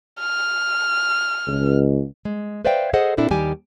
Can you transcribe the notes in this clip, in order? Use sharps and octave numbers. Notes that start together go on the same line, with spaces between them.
F6
C#2
G#3
B4 C5 D5 E5 F5 G5
G#4 A4 C5 D#5 F#5
A#2 C4 D4 E4 A4
D#2 D#3 G3 G4 G#5